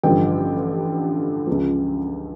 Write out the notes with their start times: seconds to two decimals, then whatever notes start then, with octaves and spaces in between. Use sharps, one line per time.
0.03 A1 G2 D3 F3 G5
1.47 C#2 C#3 F3